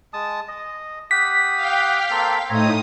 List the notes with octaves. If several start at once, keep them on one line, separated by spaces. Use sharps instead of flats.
G#3 A5 D#6
D#5
G4 F#5 D#6 B6
F5 G5
A#3 C4 A4
A2 C4 D#4 C#5 A#5 D#6